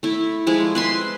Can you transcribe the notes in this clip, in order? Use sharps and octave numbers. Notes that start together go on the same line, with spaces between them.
A3 E4
F3 G#3 E4
B4 E5 C6